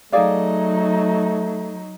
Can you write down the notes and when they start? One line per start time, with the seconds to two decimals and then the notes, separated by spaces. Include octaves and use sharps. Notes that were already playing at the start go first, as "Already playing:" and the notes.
0.12 F#3 A3 D#4 G#4 D5 F5